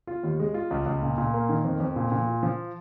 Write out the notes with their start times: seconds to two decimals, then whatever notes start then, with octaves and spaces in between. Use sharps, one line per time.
0.07 F4
0.23 D#2
0.40 G#3
0.54 F4
0.71 C#2
0.86 C#2
1.02 A#2
1.18 A#2
1.34 A#3
1.49 D#3
1.64 F2
1.80 F2
1.96 A#2
2.12 A#2
2.26 F4
2.43 F3